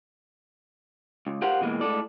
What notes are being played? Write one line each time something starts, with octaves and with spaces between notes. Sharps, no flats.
C#2
G4 A#4 C5 F5 F#5
B2 E3 G#3 A#3
A2 G#3 A4 D5